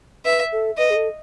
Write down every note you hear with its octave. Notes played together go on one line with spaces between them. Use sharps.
B4 E5
A4
B4 D#5
G#4
A4